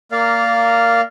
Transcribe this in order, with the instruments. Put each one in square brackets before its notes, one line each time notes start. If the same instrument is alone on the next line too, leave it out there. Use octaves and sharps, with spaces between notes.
[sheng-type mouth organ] A#3 A#4 D5 F5